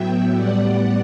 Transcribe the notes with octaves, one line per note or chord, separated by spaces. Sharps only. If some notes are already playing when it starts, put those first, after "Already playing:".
Already playing: A2 F#3 B3 E5 G5
A2 G3 B3 D5 F#5